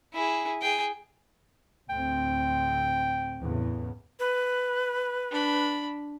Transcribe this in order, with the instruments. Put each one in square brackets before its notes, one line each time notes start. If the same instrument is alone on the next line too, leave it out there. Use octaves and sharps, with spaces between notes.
[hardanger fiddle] E4 G#4
G#4 G5
[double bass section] D2 A2 C4 [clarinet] G5
[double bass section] E2 A2 C#3
[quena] B4
[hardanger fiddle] D4 B5